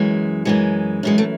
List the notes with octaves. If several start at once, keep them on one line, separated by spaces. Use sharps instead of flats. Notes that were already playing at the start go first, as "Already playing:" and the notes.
Already playing: F#2 E3 G#3
F#2 E3 G#3
F#2 E3 G#3
A3